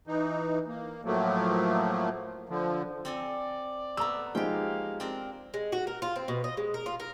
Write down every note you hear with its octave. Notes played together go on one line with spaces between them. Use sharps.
E3 D#4
A#3
A2 F3 F#3 A3 A#3
D3 F3
C4 A4 D5 G#5
A3 B3 A#5 E6
F3 G#3 A#3 D#4 G4 F5 G5
C4 D4 A#4
G#3
F#4
A#4
F4
C4
B2
D#5
G#3
A#4
F4
A#4